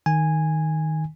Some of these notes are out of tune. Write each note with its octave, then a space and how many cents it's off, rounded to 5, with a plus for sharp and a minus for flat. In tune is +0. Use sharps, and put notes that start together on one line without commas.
D#3 +0 G#5 -10